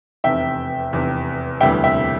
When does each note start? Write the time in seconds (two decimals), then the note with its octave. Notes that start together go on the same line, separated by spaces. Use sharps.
0.24 F1 E2 C3 E5 G5
0.93 F1 E2 C3
1.61 E1 D2 C3 E3 G3 E5 G5
1.84 E5 G5